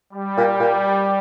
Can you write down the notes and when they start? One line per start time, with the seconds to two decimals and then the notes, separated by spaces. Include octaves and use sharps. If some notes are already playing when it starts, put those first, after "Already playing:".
0.13 G3
0.37 A#2
0.60 A#2